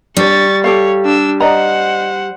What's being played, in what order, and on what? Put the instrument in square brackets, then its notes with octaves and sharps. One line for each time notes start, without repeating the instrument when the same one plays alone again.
[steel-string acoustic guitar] G3 [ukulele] D4 C#5 [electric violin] C#6 A6
[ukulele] G4 A4 F5 [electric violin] C#5
[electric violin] D4 E6
[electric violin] C5 F#5 [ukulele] D5 D#5 A#5